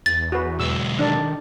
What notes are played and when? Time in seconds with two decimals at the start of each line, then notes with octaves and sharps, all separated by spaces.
0.06 E2 A6
0.32 F#4 B4
0.60 B1 G#3 E6
0.99 D#3 D4 D5